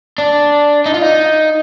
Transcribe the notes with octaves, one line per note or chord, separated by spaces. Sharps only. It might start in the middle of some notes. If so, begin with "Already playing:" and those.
D4
D#4
F4
D#4